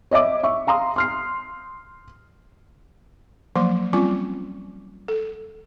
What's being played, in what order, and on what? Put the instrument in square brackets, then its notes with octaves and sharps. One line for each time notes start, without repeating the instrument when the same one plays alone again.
[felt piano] C#5 D#5 E5 D6
E5 C#6
F5 A#5 C6 D#6
C6 F6 C7
[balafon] F3 F#3 A#3 C6
G3 C4 C#4 F4 D6
A4